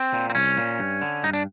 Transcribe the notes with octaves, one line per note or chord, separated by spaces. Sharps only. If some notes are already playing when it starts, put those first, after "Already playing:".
Already playing: C4
A#2
C4
C2 C#4
A#2
G2
D3
G2 D#4
D4